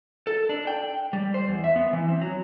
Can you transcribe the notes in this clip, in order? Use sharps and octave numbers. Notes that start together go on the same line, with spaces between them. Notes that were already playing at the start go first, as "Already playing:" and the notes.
A4
D4
G5
G3
C5
E2
E5
B3
E3
C4
F#3